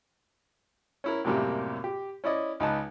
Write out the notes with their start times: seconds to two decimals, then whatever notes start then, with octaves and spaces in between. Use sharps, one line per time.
1.04 C#4 E4 A#4
1.24 F#2 A2 C3 G3 A#3
1.84 G4
2.24 C#4 E4 D5 D#5
2.60 C#2 D#4 B4 D#5 A5